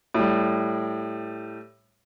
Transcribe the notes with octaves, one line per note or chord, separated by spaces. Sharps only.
A2 G3